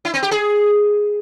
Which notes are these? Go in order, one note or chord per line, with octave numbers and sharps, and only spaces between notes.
E4
C4
G4
G#4